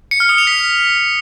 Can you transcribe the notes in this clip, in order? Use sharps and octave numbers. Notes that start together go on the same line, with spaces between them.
C#7
F6
D#6
F7
B6